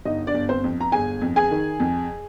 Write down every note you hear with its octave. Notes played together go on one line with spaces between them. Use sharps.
G1 D#4 D#5
D4 D5
G1
C4 C5
F2
A#5
G1 G#4 G#5
F2
G#4 G#5
D#3
F2